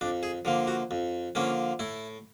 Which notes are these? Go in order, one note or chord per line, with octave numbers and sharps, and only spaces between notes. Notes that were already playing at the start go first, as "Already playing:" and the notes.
F2 D4
G#4
D3 F3 A#3
F#4
F2
D3 F3 A#3 C#4
A2 E4